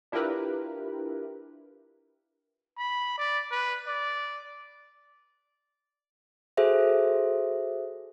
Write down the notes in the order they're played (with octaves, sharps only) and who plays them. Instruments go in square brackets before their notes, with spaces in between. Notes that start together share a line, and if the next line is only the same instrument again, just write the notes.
[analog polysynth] D4 E4 F4 G4 A#4 B4
[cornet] B5
D5
B4
D5
[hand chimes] F#4 G#4 A4 C5 E5